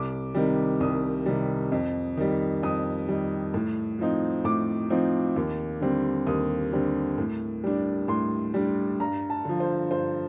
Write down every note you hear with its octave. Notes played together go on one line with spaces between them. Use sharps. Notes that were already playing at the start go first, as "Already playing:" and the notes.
Already playing: C2 D6
C3 D#3 G3
C2 D#6
C3 D#3 G3
F2
D#3 G3
F2 D#6
D#3 G3
A2
F3 C4 D#4
A2 D6
F3 C4 D#4
D#2
D3 G3 C4
D#2 D#6
D3 G3 C4
A2
G3 D4
A2 C6
G3 D4
G2 A#5
A5
D3 F3
C5
G2 C5